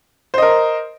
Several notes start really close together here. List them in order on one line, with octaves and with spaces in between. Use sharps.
C5 D#5 A#4